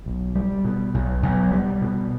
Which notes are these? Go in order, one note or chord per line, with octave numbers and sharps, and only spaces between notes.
B1
G3
B2
B1
B1
G3
B2